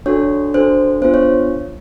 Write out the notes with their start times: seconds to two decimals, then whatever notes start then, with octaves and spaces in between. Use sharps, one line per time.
0.06 D4 F#4 A4 C#5
0.54 D4 F#4 A4 C5
1.01 B3 D4 F4 C5
1.14 C#5